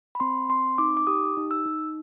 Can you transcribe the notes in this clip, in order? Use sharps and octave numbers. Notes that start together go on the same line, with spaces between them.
B5
C4 C6
C4 C6
D#4 D6
D6
G4 D#6
D#4
E6
D#4